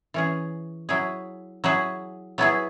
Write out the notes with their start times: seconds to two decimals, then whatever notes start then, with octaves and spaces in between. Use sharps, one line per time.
0.14 E3 C#4 G#4
0.89 F#3 E4 G#4
1.64 F#3 E4 G#4
2.38 F#3 B3 E4 G#4